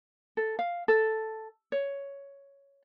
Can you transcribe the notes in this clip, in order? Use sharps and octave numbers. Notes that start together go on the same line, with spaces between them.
A4
F5
A4
C#5